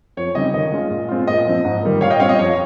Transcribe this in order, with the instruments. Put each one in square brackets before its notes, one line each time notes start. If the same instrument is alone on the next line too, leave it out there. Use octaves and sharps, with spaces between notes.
[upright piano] F2 C#5
C#3 G3 C4 D#4 D#5
D#3 D#5
G#3 C#4 F4
A#2
G#3 C4 F4
A#2 D#5
F3 C4
G#2
D#3 G3 A#3
A#2 C#5 F5
D#5 G5
G3 C4 F4 C#5 F5
D#5
F2 C#5